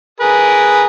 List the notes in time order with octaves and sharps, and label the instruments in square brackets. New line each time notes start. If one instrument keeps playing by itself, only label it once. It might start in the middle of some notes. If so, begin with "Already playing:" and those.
[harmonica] G#4 A#4 B4